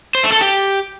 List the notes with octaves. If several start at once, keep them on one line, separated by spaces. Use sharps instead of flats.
C5
A3
A4
G4